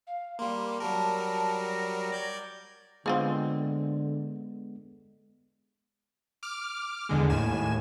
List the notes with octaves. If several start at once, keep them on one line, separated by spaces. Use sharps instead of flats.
F5
G3 A#3 C6
F#3 G3 A#4 A5
A#6
D5 G6 G#6
D3 G#3 B3 C4 F4 G#4
D6 F6
E2 D3 G#3
D#2 A2 G#5 E7